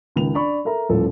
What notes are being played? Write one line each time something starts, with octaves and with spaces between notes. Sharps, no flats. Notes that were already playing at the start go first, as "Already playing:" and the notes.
C#2 D#3 F7
D4 D5 B5 C#6
A4 A#4 E5 A#5
D#1 A1 F3 A4